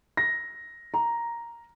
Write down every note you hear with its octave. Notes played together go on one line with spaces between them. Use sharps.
A#6
A#5